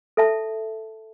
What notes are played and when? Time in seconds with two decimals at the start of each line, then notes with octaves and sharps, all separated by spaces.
0.17 A4 E5 A5